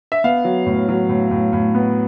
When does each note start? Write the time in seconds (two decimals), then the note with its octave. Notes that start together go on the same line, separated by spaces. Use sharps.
0.12 E5
0.24 B3 F5
0.44 F#3
0.66 A2
0.89 F#3
1.09 A2
1.31 A2
1.53 A2
1.75 B3